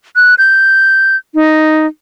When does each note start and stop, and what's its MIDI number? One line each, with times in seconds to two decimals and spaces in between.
0.16 0.35 90
0.38 1.16 91
1.34 1.86 63